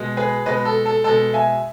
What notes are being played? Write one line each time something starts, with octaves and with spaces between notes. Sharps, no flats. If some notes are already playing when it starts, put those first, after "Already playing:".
Already playing: B2 G#3
G#4 B4
B2 G#3 B4 D#5
A4
A4
B2 G#3 A4
E5 G#5